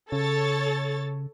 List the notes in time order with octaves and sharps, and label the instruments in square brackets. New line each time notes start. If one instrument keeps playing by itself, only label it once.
[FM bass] C#3 [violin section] A4 C#5 A6